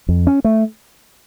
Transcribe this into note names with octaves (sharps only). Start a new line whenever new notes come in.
F2
C#4
A3